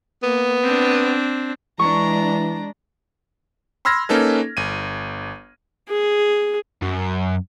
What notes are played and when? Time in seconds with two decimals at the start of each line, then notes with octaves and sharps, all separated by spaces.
0.23 A#3 B3
0.64 C4 D4
1.79 E3 G#3 D4 A#5 C#6
3.85 B5 C6 E6 F6 G#6 A#6
4.09 A#3 C#4 D#4 A4 B4
4.57 G1 D#7
5.89 G#4
6.82 F#2